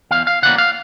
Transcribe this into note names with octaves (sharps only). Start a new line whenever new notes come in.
E2 F5
F5
C#3 E3 G3 A#3 F#5
F5